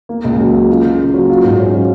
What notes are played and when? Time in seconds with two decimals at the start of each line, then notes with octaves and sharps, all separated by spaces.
0.09 A#3
0.24 C#2
0.39 F#3
0.54 C#3
0.69 F4
0.84 C#3
0.99 A#3
1.14 F#3
1.29 F4
1.44 G#2
1.59 C#4
1.74 F#3